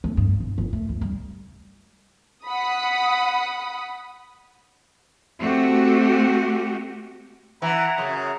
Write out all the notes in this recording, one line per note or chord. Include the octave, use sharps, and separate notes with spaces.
A3
G2
E1
G1
A3
D2
G3
F#5 B5 D#6
A3 C4 F#4 G4
E3 E5 F#5 A#5
F#2 C#3